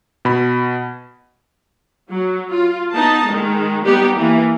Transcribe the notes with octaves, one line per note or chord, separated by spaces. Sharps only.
B2 B5
F#3
F4
B3 D#4 A5
D#3 G#3
G3 B3 D#4 G4
E3 A#3